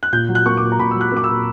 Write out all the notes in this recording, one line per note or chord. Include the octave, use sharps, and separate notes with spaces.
F#6
A#2 G6
F#3
F#6
A#3 C#6
A#2 D6
A#5
A#2 B5
F#3 E6
F#6
A#3 D6
E6
A#2